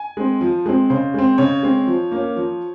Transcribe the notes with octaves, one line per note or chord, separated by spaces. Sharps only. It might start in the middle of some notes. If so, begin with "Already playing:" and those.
Already playing: G#5
G#3 C4
F3
G#3 C4
C#3 C5
G#3 C4
C#3 C#5
G#3 C4
F3
A#3 C#4
F3